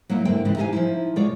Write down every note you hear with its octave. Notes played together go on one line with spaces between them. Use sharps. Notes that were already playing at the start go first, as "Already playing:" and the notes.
F#3 A#3 D#4 E4
G#2 D3 A#3 E4 G5
G#2 C#3 E3
D#4 G4 A4 D#5 F5 G#5
F3 D#4 E4
B2 G#3 F4 C#5 D5